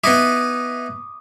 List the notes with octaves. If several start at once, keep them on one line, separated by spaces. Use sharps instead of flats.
B3 D#4 E4 D6 D#6